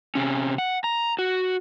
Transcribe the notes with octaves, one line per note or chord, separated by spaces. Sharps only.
C3 C#4
F#5
A#5
F#4